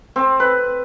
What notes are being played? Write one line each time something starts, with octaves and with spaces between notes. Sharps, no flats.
C4
B4